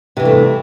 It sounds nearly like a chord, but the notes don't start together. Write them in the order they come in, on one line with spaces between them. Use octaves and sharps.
C3 E3 G2 A3